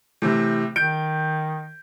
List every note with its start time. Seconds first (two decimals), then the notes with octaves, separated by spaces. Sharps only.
0.22 A2 C3 E3
0.76 D#3 G6 D7